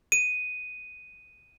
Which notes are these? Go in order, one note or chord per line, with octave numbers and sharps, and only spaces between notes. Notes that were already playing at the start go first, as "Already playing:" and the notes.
D#7